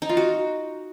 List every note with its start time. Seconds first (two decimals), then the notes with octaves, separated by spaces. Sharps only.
0.02 D#4
0.09 F4
0.17 F#4